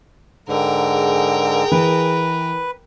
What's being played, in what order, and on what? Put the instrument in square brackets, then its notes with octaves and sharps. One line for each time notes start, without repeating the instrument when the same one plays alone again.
[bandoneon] G#2 D3 [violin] A#4 G5
[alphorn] G#4
[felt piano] E3 [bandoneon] B4